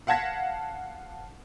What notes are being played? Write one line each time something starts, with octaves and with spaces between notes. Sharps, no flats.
F5 F#5 A5 G#6 A#6 B6